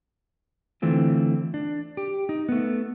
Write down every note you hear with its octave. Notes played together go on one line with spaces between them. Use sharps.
D3 E3 A3 C4 F4
D4
G4
D#4
A3 B3